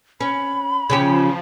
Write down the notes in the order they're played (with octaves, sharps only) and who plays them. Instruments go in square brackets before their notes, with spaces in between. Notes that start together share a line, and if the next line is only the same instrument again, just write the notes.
[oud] C#4 [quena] B5
[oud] C#3 C#4 G4 [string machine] F3